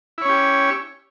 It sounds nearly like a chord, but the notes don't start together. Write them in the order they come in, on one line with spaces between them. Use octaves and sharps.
E4 C#5 C#4 G4